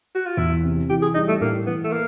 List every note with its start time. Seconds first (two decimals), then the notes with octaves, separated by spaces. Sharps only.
0.15 F#4
0.26 F4
0.37 E2 E4
0.63 C3
0.90 E3 G4
1.02 G#4
1.15 G3 D#4
1.28 A3
1.41 A2 A#3
1.67 E3 B3
1.84 A3
1.92 A#3